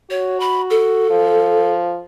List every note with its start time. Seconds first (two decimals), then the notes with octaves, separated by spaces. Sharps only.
0.11 F#4 C#5
0.40 B5
0.70 A4
1.10 F3